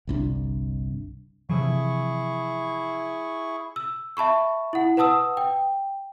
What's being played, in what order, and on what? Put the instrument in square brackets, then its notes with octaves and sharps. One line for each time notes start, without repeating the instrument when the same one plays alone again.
[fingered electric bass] G1 C2 C#4 D4
[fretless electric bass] C3 E3 F3 [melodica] E4 G#4 C#6
[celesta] E6
E5 A5 B5 C#6
E4 F#5
B4 F#5 A5 D#6 E6
G5